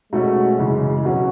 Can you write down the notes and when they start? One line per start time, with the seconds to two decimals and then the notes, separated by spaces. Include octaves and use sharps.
0.13 B2 G#3 A3 C#4 F#4
0.59 F#2 C#3 E3
1.05 B2 F#3 C#4 F#4